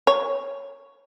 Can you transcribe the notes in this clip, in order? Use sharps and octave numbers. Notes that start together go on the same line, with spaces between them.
C#5